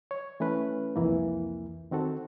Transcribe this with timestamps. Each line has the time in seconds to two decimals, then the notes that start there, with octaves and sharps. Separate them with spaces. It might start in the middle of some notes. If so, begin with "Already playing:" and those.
0.11 C#5
0.40 E3 A3 C#4 B4
0.96 C2 F2 E3 A#3
1.91 D#3 C4 F#4 A4